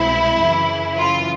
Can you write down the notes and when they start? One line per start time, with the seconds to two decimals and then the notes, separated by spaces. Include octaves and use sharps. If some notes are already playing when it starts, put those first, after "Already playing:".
Already playing: C2 B2 G#3 C4 E4
0.39 F#2 C#3 E3
0.97 F4